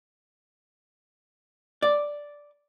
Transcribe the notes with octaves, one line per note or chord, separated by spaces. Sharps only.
D5